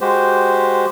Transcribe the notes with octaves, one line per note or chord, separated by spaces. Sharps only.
G#3 F#4 G4 C5